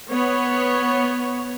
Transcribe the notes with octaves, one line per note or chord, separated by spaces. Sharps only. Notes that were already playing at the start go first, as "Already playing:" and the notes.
B3 C#5